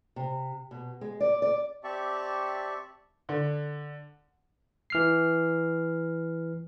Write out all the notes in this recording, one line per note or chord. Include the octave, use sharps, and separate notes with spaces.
C3
B2
G#3
D5
D5
C4 G4 D5 E5 A5 C#6
D3
E3 F6 C7